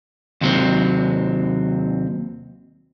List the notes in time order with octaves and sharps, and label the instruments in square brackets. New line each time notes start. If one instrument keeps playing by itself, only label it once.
[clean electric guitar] D#2 C3 F#3 C4